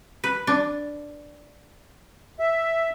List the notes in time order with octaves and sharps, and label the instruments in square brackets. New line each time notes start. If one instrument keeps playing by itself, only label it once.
[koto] B4
D4
[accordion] E5